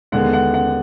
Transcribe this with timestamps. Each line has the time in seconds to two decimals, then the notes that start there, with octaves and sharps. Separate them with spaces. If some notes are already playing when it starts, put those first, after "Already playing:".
0.12 D#2 D3 G#3 B3 F#5
0.33 F#5
0.54 F#5